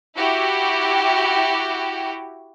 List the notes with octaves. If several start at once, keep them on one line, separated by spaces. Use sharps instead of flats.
E4 F#4 G4